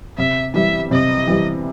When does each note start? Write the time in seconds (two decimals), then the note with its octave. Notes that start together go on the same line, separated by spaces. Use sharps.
0.18 C3 E5
0.54 E3 G3 E5
0.91 C3 D#5
1.28 E3 G3